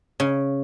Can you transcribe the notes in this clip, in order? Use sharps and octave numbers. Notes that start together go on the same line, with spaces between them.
C#3